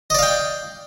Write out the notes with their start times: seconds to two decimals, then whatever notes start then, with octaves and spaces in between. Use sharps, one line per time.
0.10 D#5
0.14 D5
0.19 F5
0.23 G5